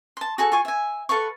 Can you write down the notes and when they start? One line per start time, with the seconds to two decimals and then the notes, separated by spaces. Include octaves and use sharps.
0.17 A5 C6
0.38 F#4 G#4 A4
0.52 F4 G#5 C#6
0.65 E5 G#5
1.09 A4 B4 F5 C#6